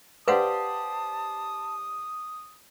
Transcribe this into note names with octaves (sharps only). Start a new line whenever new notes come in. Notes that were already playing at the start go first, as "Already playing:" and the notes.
G4 B4 C5 D5 F5 F#5 A5 D#6